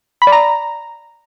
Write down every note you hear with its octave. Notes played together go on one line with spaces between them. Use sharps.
B5
D5
A#5